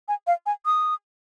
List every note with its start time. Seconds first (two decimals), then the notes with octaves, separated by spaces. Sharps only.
0.08 G#5
0.27 F5
0.46 G#5
0.66 D#6